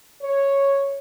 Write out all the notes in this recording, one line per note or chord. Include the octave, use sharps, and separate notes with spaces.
C#5